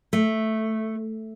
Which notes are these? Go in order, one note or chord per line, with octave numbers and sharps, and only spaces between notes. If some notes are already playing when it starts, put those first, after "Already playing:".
A3